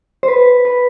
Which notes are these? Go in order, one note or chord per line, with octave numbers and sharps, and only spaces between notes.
C5
B4
B4